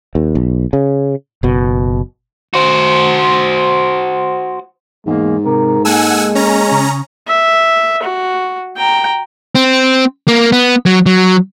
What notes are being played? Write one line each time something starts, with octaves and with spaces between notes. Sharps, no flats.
D#2
B1
C#3
F#1 B2
F#4 C5
E2 G#2 G#3 A#3
C3 A#4
G#3 A#3 A4 F#5 G#5 E6
C#4 A#5
C#3
E5
F#4
G5 A#5
C4
A#3
B3
F#3
F#3